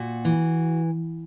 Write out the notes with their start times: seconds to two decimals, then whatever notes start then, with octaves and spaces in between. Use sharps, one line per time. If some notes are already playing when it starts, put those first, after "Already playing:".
Already playing: A#2 F#4
0.25 E3